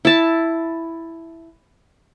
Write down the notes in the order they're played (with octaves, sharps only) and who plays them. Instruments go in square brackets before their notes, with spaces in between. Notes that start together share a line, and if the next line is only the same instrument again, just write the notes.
[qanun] E4 A5